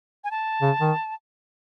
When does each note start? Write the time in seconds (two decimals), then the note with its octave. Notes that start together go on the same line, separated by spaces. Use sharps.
0.24 G#5
0.31 A5
0.62 C#3
0.81 D#3